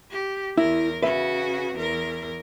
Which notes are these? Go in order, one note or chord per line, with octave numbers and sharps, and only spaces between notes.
G4
E2 E4 A#4
C#3 F#4 B4 E5
E2 A#4